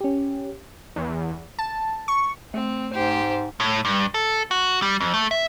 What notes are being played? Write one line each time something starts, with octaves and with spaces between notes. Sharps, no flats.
C#4 G4
E2
A5
C#6
A3 C4
G#2 G4 C5
A2
G2
A4
F#4
G3
F2
A3
E5